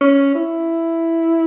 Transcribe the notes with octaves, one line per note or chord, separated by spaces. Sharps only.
C#4
E4